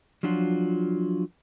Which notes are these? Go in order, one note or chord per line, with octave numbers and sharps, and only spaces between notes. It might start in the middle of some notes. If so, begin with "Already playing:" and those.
F3 F#3 D4 F4 F#4